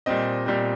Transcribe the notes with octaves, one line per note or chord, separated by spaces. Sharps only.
A#2 G3 C4 D#5
A#2 G3 C4